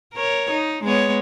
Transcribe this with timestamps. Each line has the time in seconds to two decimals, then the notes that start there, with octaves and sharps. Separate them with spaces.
0.14 A#4 C#5
0.51 D#4
0.83 G#3 B3 C#5